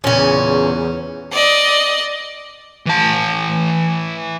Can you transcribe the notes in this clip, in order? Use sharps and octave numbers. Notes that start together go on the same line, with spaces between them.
E2 A#2 C#3 C#4
D5 D#5
E3 A5